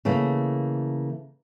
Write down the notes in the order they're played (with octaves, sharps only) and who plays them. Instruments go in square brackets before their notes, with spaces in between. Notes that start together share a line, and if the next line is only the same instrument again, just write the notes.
[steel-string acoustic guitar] C#3 E3 A3 A#3